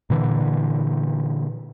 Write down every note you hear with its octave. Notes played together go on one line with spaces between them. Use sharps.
A#2 D3 E3